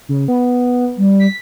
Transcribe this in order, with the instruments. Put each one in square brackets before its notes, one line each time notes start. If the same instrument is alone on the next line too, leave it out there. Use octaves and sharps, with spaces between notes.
[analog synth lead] C#3
B3
[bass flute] G3
[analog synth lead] B6